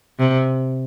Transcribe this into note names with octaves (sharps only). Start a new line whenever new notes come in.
C3